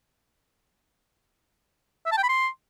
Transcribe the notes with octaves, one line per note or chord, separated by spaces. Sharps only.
E5
A5
G5
B5
C6